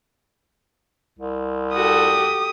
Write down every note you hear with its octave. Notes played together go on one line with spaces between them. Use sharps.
C2
F#4 G4 A4 D#6